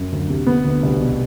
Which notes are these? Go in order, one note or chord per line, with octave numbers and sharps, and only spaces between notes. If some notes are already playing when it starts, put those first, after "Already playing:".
Already playing: F#2
D2
C3
D3 B3
D2
C2
B2